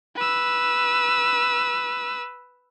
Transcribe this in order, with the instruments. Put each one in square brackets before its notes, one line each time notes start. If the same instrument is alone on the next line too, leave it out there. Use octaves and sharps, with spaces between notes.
[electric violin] B4 E6